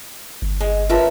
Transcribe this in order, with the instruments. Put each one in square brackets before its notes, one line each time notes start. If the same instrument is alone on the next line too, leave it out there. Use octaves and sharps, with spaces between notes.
[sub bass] G1
[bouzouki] G#3 [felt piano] G#5
[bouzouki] C#4 A#4 E5 [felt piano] F4 B4 A5